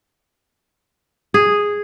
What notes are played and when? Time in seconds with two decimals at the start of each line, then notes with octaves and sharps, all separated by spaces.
1.34 G#4